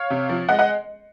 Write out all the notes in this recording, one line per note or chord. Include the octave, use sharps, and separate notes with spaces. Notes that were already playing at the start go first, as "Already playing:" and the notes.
Already playing: C#5 F5
C3
F3
G#3 D#5 F#5
D#5 F#5